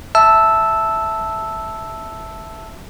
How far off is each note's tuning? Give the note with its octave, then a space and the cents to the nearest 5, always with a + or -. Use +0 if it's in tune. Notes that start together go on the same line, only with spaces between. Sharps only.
E5 +0 A5 +0 E6 -5